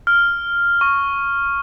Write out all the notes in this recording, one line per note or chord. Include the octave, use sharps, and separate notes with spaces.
F6
C#6